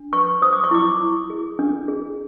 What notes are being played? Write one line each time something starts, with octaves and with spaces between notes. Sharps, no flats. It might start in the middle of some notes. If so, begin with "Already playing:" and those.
Already playing: D4
B4 C#6
C5 D#6
D6
C#6
E4 D6
E4
G#4
D4
G#4